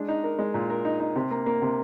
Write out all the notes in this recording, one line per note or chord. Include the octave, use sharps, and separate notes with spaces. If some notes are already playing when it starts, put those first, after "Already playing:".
Already playing: G#3 D4
D#4
A#4
G#3
A#2
A#4
D#4
D#4
C3
A#3
A#3
C3